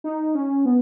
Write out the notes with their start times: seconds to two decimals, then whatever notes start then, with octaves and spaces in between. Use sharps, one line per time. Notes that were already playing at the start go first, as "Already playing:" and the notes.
0.04 D#4
0.35 C#4
0.66 B3